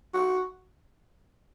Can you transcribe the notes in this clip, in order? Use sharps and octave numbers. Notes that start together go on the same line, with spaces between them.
F#4